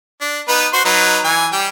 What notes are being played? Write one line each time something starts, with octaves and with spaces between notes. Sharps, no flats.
D4
B3 D#4 B4
F#4 C5 C6
F#3 D#4 B4
E3 G#5
G3 G5